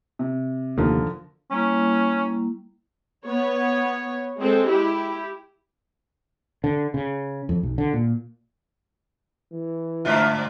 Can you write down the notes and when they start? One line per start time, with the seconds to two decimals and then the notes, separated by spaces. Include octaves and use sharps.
0.19 C3
0.78 F1 D#2 D3 F3 A#4
1.51 G3 A#3 C#4 E4
3.25 B3 C#5
4.39 G#3 C4 A4
4.68 E4 G4
6.64 D3
6.94 C#3
7.49 F2
7.63 B1
7.78 D3
7.93 A#2
9.52 E3
10.05 G2 D3 A3 D4 F4 E5